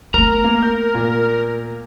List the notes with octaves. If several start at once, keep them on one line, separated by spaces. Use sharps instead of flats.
A3 B3 A#4 A#5
A#3
G6
A#2